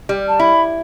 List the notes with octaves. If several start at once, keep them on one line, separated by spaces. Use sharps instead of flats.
G3
A5
E4 B5